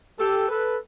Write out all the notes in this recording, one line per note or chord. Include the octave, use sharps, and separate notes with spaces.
G4 A4
A4 B4